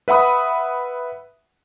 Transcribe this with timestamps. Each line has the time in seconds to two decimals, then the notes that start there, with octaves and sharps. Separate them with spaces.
0.08 B4 E5 F#5 B5 D#6